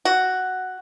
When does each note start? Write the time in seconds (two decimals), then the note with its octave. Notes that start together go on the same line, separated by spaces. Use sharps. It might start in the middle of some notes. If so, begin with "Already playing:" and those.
0.05 F#4